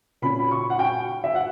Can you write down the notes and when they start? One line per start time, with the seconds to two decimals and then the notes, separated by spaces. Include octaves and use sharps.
0.22 A#2 A#3 C#4 B5
0.39 B5
0.51 C#6
0.70 F#5
0.79 G5
1.24 E5
1.35 F#5